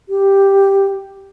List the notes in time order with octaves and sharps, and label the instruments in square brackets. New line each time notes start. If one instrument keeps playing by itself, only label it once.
[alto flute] G4